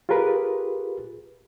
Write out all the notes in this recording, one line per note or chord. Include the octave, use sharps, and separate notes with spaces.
F4 G4 G#4 A#4 B4